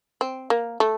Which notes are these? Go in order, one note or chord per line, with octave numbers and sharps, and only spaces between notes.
C4
A#3
A3